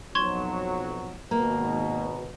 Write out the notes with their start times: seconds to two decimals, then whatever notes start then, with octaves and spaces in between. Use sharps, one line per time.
0.15 B1 F2 F#3 C6 C#6 G#6 E7
1.31 G#1 B2 A#3 A#5